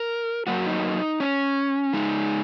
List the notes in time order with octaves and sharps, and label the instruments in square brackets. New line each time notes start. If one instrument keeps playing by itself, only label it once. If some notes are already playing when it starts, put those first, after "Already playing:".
Already playing: [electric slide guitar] A#4
F#2 F#3 A#3 F#4
D#4
C#4
C#3 G#3 D#4